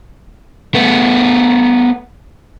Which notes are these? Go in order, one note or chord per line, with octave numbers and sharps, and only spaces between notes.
A3 B3